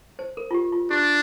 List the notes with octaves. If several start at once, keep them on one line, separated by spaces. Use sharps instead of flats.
C5
A#4
F4
G4
F4
D4 G4